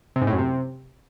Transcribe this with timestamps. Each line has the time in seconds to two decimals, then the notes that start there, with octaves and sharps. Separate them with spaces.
0.16 C3
0.21 G#2
0.27 A2
0.33 F#2
0.38 C3